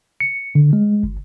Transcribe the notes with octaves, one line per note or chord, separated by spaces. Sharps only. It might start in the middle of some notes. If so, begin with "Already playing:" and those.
C#7
D3
G#3
G1